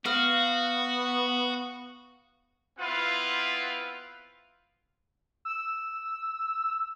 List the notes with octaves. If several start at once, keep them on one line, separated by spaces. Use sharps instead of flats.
B3 F#4 F5
B3 C4 E4 F4 B4 F5
E6